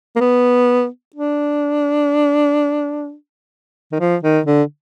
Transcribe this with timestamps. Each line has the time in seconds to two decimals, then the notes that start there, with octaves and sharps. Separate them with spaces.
0.16 A#3
0.21 B3
1.16 D4
3.92 D#3
4.00 F3
4.23 D#3
4.46 D3